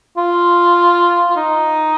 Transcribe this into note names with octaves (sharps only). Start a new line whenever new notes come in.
F4
F4
D#4